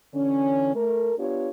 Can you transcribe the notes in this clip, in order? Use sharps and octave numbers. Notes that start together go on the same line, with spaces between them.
D3 E3 C#4
A3 A#4
B3 D4 F4 G4 C#5